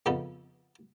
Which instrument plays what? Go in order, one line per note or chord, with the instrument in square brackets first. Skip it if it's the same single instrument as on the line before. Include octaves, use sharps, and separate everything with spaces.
[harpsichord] F2 C#3 B3 D#4 A4